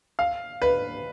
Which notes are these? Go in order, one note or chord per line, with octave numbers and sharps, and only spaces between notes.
F5
B4